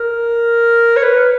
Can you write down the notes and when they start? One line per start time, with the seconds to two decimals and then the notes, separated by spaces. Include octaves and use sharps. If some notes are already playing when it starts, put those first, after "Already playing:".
Already playing: A#4
0.97 C#5
1.03 B4